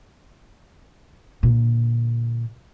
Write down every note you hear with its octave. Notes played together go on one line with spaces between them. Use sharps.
A#2 D3